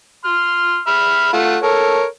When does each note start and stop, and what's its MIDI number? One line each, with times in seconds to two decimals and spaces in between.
0.25 0.79 84
0.25 0.79 89
0.87 1.29 76
0.87 1.29 83
0.87 1.29 89
1.33 1.57 57
1.33 1.57 65
1.33 1.57 78
1.63 2.05 69
1.63 2.05 70
1.63 2.05 73